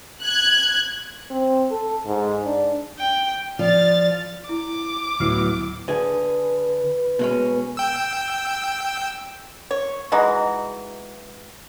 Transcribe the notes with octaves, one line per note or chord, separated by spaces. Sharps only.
F#6 G#6
C4
A4
G#2
D4
G5
F3 D5 F6 A6
E4 D6
D2 A2 F#3 B3 E4 F6 C7
D3 G#4 B4
B2 G#3 C#4
G5 E6
C#5
E3 G#3 D#4 F#4